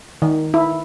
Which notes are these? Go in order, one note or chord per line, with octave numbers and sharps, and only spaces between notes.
D#3
E4